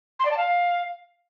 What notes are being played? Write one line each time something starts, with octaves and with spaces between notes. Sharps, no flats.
C6
D5
A5
F5